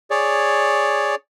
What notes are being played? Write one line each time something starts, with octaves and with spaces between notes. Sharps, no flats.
G#4 C#5 D5